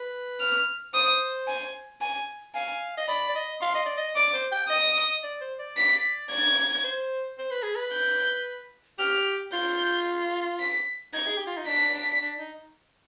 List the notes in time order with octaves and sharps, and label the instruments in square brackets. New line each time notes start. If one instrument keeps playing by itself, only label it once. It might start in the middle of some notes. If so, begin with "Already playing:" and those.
Already playing: [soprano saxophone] B4
[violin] F6
[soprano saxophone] C5 [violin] D#6
[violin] G#5
G#5
[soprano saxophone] F5 [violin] G#5
[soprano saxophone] D#5
[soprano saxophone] D5 [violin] B5
[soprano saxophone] D5
D#5
[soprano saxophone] F5 [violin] C6
[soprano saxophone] D#5
D5
D#5
[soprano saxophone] D5 [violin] D6
[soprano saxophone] C5
G5
[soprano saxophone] D#5 [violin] D#6
[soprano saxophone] D#5
D5
C5
D5
[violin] B6
G#6
[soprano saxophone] C5
C5
B4
G#4
B4
[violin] G6
[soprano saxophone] G4 [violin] F6
[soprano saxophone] F4 [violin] G6
[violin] B6
[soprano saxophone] D#4 [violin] G#6
[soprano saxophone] G#4
G4
F4
D#4
[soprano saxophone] D4 [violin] B6
[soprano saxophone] D4
D4
D#4